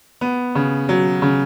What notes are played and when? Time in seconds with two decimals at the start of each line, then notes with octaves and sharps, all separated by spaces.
0.21 B3
0.55 C#3
0.89 F#3
1.22 C#3